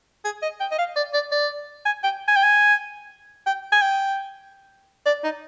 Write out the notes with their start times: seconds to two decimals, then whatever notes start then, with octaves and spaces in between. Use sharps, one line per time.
0.25 G#4
0.42 D#5
0.60 G5
0.71 D#5
0.79 F5
0.96 D5
1.14 D5
1.32 D5
1.85 G#5
2.04 G5
2.28 G#5
2.36 G5
2.44 G#5
3.46 G5
3.72 G#5
3.82 G5
5.06 D5
5.24 D#4